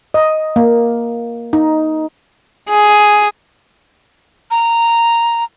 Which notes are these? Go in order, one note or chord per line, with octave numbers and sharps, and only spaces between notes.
D#5
A#3
D#4
G#4
A#5